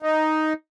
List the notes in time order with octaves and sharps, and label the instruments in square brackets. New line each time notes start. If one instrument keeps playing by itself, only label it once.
[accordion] D#4